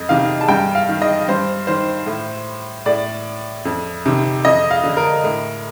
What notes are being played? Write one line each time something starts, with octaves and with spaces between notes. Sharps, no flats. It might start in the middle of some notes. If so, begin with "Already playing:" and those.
Already playing: F2 D#5
C3 D#3 F5
A5
G2 G5
F5
D#3
D#5
G2 C5
D#3 C5
A2
A2 D5
F2
C3 D#3
F2 D#5
F5
D3
A#4
A2